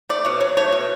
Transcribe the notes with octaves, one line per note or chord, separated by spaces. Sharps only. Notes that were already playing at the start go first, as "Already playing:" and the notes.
A3 D5
B2 C#5
F#3 C#5
A3 C#5
B2